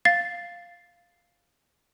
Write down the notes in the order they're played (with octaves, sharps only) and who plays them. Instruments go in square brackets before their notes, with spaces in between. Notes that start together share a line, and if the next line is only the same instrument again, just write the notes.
[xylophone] F5 A6 C7